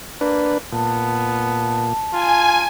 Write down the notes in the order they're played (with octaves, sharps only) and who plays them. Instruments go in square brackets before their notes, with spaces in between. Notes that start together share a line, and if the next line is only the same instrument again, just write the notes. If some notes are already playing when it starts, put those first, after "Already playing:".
[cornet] A#3 [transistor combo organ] D4 B4
[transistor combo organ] A#2 [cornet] B3 [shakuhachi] A5
[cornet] F4 [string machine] G#5